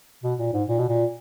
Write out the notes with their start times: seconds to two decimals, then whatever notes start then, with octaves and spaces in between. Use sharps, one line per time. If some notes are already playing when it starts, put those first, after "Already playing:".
0.24 B2
0.39 A#2
0.53 G#2
0.68 A#2
0.78 B2
0.89 A#2